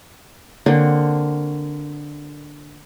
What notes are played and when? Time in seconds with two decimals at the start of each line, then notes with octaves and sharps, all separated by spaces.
0.66 D3 A#3 C4 F#4